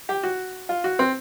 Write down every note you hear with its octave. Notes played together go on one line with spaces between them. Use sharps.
G4
F#4
F4
F#4
C4